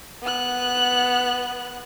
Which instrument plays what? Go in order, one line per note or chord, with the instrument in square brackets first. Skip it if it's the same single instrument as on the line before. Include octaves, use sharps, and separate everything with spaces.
[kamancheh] B3 F#6